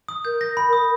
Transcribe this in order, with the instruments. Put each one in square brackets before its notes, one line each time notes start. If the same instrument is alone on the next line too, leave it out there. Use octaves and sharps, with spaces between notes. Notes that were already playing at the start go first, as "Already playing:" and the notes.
[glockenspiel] D#6
[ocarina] A#4 [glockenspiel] G6
[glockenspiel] A#6
B5
D#6